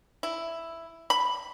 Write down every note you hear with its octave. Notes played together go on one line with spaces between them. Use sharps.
E4
B5